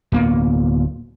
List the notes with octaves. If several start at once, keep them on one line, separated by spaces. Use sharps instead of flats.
D1 A#3 B3